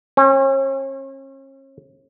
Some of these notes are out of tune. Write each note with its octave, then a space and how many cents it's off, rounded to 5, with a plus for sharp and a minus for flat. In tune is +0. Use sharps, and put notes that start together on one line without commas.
C#4 -40